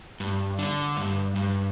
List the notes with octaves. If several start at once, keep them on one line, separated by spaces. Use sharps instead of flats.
G2
D3
G2
G2